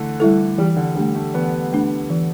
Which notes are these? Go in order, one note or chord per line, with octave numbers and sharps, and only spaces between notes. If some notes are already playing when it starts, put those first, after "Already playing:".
Already playing: D3 E3 A3
G3 E4 A4
E3 G3
D3
G3 A3 D4
A3
E3 B3
A3 D4
E3